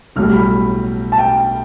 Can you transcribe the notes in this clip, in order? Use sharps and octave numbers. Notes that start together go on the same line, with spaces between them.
B1 A2 G3 F6
B5
A5
G5